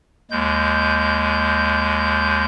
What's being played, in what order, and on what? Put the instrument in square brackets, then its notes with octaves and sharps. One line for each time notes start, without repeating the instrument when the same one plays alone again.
[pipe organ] D#2 G#3 G6